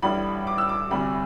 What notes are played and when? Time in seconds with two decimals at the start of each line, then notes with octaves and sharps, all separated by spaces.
0.02 A1 A2 G3 D4 B5
0.47 D6
0.58 E6
0.69 D6
0.91 D2 C3 G3 B5